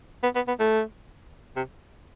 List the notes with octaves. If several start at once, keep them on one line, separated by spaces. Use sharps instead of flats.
B3
B3
B3
A3
C3